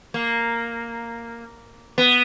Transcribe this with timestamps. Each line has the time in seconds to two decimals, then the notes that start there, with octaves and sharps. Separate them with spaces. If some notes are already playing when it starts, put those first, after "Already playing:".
0.14 A#3
1.98 B3